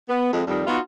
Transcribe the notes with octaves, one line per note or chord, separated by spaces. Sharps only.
B3
F2 G#3
F2 D#3 G3
B3 D#4 F4 F#4